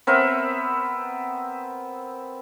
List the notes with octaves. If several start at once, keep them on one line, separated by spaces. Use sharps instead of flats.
B3 C4 A#4 E5